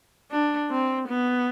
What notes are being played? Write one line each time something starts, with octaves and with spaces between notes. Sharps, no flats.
D4
C4
B3